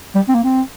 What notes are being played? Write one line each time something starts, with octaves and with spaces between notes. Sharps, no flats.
G3
C4
A#3
C4